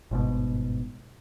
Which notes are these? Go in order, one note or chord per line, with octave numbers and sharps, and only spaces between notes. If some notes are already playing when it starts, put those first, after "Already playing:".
G1 G#2 B2